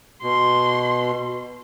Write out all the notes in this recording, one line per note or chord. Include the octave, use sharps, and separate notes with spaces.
B2 C6